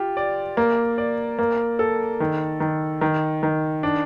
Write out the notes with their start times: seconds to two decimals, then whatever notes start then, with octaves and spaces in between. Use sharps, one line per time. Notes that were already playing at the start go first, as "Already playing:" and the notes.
Already playing: F4 G4
0.17 D5
0.57 A#3
0.98 D5
1.39 A#3
1.79 A4
2.20 D#3
2.60 D#3
3.01 D#3
3.43 D#3
3.83 D4